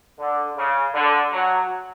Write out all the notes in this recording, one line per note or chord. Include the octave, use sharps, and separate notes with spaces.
D3
C#3
D3
F#3